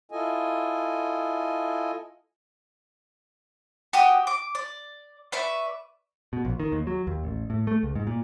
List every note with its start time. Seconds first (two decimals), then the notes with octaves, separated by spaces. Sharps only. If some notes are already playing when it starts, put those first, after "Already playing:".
0.11 E4 F4 A4 D#5 G#5
3.93 F#4 G4 G5 D#6
4.27 D6
4.55 D5
5.32 B4 D5 E5 C#6
6.33 B2
6.45 A#1
6.60 D#3
6.72 D#2
6.87 F#3
7.07 D#2
7.23 A1
7.50 A2
7.67 A3
7.83 C#2
7.95 G#2
8.07 A#2